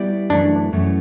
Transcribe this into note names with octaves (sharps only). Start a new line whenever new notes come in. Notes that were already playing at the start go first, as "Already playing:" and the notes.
Already playing: G3 B3 E4 G4 D5
F#2 E3 A3 D4
F#2 E3 A3 C#4